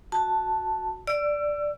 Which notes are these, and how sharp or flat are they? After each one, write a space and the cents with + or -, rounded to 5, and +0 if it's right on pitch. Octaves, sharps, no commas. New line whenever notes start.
F#4 +0 A5 +0
D5 +0 E6 +30